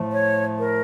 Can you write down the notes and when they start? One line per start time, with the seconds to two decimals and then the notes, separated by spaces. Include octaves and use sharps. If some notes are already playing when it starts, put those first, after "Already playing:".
Already playing: A2 F3 A3
0.13 C#5
0.59 A#4